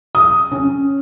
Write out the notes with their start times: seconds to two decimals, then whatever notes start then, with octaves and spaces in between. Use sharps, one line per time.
0.15 D#6
0.52 C#4